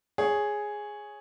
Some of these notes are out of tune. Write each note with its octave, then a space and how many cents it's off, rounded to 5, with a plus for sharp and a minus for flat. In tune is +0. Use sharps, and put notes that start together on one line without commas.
G#4 +0 C#5 +0